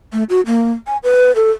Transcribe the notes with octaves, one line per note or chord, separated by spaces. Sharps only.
A3
F#4
A#3
G#5
B4
A4